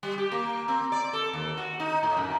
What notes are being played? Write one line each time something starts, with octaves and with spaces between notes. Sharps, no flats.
G3
G4
A#3
C4
D5
A4
D#2
F#4
D#4
A2
F#2